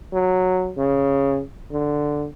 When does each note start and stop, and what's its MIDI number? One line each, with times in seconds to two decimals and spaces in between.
0.13 0.71 54
0.78 1.40 49
1.72 2.26 50